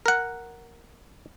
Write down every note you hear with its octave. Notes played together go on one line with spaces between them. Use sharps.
A#4 F#5